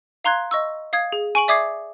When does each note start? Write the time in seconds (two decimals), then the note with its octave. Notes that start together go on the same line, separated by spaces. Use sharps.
0.24 F5 A#5 C6 F#6 G#6
0.51 D#5 C#6 E6
0.93 F5 D#6 G#6
1.12 G#4
1.35 G#5 C#6 D7 F#7
1.48 D5 E5 D6 D#6 G#6 C7